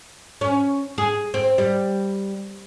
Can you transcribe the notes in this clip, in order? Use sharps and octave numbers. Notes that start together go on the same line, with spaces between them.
C#4
G#4
C4
G3